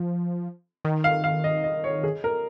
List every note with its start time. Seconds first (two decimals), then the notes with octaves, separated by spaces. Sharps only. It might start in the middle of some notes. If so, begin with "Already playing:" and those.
Already playing: F3
0.85 D#3
1.04 F5
1.24 F5
1.44 D#5
1.64 D#5
1.84 C#5
2.03 G#4
2.24 A#4